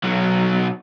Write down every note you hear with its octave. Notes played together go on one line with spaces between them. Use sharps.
B1 F#3